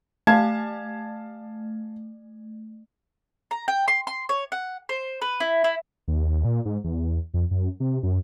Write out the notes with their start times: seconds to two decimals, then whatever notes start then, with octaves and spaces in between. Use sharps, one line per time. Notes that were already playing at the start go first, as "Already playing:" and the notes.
0.27 A3 F5 A5 G#6
3.51 A#5
3.68 G5
3.88 C6
4.07 C6
4.29 C#5
4.52 F#5
4.89 C5
5.22 B4
5.40 E4
5.64 E4
6.08 D#2
6.45 A#2
6.65 G#2
6.84 E2
7.34 F2
7.51 F#2
7.80 C3
8.03 F#2